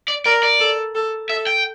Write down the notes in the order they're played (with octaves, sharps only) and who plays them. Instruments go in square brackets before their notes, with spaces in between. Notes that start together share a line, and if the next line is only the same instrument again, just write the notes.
[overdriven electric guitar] D5
[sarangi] A#4 [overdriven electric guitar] D5
[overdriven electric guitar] D5
[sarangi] A4
A4
[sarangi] A4 [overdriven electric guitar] E5
[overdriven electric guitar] G5